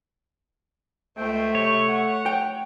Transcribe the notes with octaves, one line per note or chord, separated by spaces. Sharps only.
C#2 A3 C5 G5
C3 C#5 C#6
F#5
G5